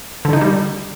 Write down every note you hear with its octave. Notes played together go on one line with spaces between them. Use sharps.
D3
D#4
G3